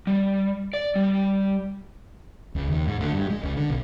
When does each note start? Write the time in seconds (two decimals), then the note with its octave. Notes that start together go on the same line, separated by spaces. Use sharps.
0.07 G3
0.73 D5
0.96 G3
2.55 C#2
2.68 D#2
2.87 G#2
3.00 D2
3.13 G2
3.30 G#3
3.43 C#2
3.57 D3
3.70 B1